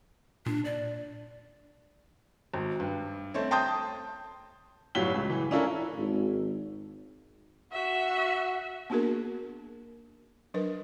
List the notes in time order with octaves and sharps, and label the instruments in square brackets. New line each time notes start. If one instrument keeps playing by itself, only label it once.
[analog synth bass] A#2 [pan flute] D4
[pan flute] D5
[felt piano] G#1
G2
A3 C4 C#5
G5 A5 C6 D#6 G6
[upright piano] G1 A2 F#3 G3 B6 G7
C#2
E3
C#4 D4 E4 F4 A4 A#4
[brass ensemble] G#1
[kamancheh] F#4 E5
[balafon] A#3 B3 D4 F#4 G#4 A#4
F#3 D4 A#4 B4